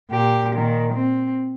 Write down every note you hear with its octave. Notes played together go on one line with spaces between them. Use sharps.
A#2 G4
A#2 D#3
C4